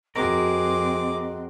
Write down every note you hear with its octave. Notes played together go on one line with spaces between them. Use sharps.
F2 C4 F#4 G#4 A#4 D#5 D6